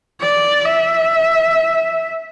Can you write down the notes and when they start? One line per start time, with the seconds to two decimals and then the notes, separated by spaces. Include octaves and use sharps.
0.21 D5
0.65 E5